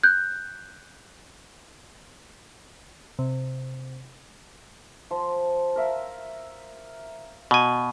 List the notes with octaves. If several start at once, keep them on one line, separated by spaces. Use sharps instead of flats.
F#6 G6
C3
F3 C6
A#4 E5 F5
B2 G#5